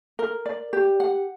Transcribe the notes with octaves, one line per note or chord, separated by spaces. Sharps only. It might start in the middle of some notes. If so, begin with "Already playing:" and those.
A#4
D5
G4
F#5